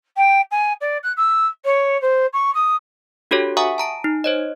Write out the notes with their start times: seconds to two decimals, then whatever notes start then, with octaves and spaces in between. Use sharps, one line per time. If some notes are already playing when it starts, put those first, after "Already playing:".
0.17 G5
0.51 G#5
0.81 D5
1.03 F#6
1.17 E6
1.65 C#5
2.02 C5
2.33 C#6
2.54 D#6
3.31 D4 F#4 G4 A4 C#5
3.57 E5 F#5 G#5 A#5 C#6 D#6
3.78 A5 A#5 D7
4.04 D#4
4.24 C5 C#5 D#5